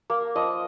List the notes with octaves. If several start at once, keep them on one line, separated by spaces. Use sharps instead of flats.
A#3
F3 D#5